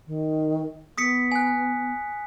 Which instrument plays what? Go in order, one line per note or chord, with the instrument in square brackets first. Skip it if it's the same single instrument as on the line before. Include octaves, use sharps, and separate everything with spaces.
[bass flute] D#3
[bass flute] B3 [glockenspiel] D#6 B6 C#7
[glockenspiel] G#5 F#6